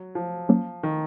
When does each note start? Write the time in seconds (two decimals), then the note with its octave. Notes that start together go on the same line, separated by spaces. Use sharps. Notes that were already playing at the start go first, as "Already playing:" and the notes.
Already playing: F#3
0.15 F3
0.49 F#3 A#3 C#4
0.83 D#3